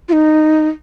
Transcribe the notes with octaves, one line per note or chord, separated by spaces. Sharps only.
F4
D#4